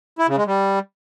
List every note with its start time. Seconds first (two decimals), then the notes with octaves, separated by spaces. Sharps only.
0.19 E4
0.28 C#3
0.37 G#3
0.47 G3